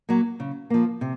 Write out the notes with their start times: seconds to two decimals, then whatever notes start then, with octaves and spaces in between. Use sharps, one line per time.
0.09 F#3 A#3
0.40 C#3
0.70 F3 A#3
1.01 C3